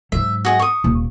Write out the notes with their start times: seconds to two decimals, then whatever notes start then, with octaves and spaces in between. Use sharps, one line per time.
0.12 G#2 F#3 E5
0.45 F#4 G#4 D#5
0.59 C#6 D#6
0.84 D#1 A#3